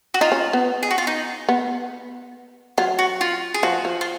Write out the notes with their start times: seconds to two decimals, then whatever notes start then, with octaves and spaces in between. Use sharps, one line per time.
0.14 F#4
0.21 D#4 F4
0.32 C#4
0.53 B3
0.83 G#4
0.91 F#4
0.98 F4
1.07 D#4
1.49 B3
2.78 F#3 F4
2.99 F#4
3.21 F4
3.54 G#4
3.63 F3 F#4
3.85 F3
4.01 F4